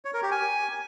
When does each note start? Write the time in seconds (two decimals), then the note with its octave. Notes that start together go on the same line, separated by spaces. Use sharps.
0.05 C#5
0.14 A#4
0.23 G4
0.31 G#5